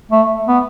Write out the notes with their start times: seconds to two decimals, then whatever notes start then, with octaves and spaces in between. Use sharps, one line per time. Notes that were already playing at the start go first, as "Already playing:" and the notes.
0.11 A3
0.48 B3